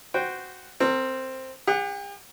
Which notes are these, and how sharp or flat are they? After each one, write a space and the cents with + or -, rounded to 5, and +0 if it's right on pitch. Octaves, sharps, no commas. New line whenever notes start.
F#4 +0 C5 -15 G5 +0
C4 +0 A#4 -40
G4 +45 F#5 +0